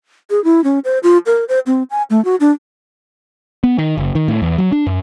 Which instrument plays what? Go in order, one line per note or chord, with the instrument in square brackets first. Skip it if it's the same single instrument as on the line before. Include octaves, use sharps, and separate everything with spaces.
[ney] G#4
E4
C#4
C5
F4
A#4
C5
C4
G#5
A3
F#4
D4
[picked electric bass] B3
D#3
F#1
D#3
A2
E2
F#3
D4
F#2